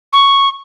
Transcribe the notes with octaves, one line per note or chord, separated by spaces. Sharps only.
C#6